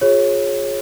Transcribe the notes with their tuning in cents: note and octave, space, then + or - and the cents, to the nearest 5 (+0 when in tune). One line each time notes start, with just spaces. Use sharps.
F4 +40 G#4 +0 C#5 -20